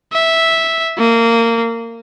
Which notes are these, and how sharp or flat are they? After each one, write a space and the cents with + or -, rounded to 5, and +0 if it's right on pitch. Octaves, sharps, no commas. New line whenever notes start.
E5 -5
A#3 -20